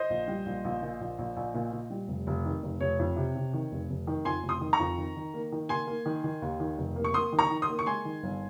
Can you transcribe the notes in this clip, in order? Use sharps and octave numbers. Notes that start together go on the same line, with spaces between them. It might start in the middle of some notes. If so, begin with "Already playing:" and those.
Already playing: C5 D#5
A#1
G3
A#1
A#1
A#2
A#1
A#1
A#1
A#2
A#2
G3
F1
F1
D#3
F1
F1 C#5
F2
C3
C3
D#3
F1
F1
D#3
F2 G#5 C6
F1
C6 D#6
D#3
A#5 C#6
F2
D#3
D#3
A#3
D#3
A#3 G#5 C6
A#3
D#3
D#3
D#2
D#3
F1
A#3
C#6
A#3 C6 D#6
D#3
A#5 C#6
D#3
C6 D#6
A#3
C#6
G#3 G#5 C6
D#3
G1